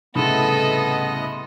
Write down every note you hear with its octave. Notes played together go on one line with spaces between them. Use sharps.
C2 A2 C#3 B3 A4 D#5 B5 C6